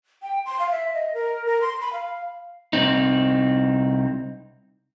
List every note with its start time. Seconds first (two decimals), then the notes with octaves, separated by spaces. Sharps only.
0.22 G5
0.46 C6
0.60 F5
0.72 E5
0.94 D#5
1.14 A#4
1.46 A#4
1.61 C6
1.81 B5
1.93 F5
2.73 C2 C4 D#4